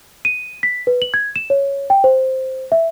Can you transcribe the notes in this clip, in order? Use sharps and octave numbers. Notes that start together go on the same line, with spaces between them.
D#7
B6
B4
F#7
G#6
E7
C#5
G5
C5
E5